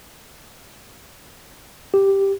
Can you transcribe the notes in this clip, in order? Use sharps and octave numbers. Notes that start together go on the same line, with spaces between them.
G4